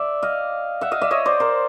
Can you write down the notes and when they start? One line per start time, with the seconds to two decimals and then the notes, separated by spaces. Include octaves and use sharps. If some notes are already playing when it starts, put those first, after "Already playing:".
Already playing: D5 E5
0.23 D#5 F5
0.81 E5 F#5
0.92 D#5 F5
1.02 D5 E5
1.11 C#5 D#5
1.26 C5 D5
1.40 A#4 C5